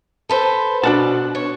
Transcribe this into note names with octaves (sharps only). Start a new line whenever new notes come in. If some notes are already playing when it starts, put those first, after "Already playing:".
A4 B4 C5
B2 D4 F#5 A5
C#5